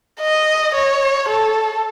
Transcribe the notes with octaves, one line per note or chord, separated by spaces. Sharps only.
D#5
C#5
A4